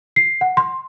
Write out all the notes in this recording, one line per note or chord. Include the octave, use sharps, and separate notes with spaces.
C7
F#5
C6